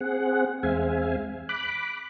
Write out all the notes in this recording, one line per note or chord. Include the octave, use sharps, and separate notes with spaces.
C4 G#4 F#5
E2 G#3 C4 E5 F5 G#5
B5 D6 F#6